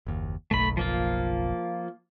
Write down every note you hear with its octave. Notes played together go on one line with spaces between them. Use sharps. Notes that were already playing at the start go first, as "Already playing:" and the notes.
F#1 D#2
F#1 B1 A3 B5
F3 A#3 F4